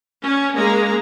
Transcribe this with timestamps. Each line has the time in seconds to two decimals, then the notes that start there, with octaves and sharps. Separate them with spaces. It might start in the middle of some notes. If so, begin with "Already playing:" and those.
0.23 C#4
0.55 G#3 A#3 G#4 A#5